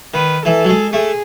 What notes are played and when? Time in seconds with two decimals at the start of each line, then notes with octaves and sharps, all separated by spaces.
0.14 D#3 B4
0.45 E3 A4
0.65 F#3
0.69 G#3
0.93 A3 G#4